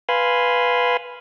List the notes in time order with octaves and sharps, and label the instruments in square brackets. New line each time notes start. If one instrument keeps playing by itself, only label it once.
[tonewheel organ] B4 F5 G#5 B5 C6